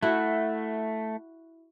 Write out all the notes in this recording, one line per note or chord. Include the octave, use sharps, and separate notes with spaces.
A3 E4 F#4